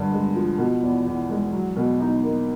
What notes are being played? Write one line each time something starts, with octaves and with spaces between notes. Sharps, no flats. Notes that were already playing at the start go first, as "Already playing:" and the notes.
Already playing: G2 D3
G#3
F3
B2
E2
E2
G#3
F#3
B2
D#4
A#3